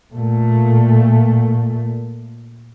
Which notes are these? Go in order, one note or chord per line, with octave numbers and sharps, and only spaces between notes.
A#2 A3